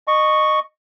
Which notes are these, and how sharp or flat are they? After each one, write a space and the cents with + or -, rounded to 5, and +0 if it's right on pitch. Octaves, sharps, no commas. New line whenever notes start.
D#5 -20 C#6 +0